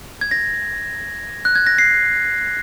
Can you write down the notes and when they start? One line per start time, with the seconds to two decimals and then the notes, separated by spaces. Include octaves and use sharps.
0.21 G#6
0.31 A#6
1.45 F#6
1.55 G#6
1.67 A#6
1.78 C7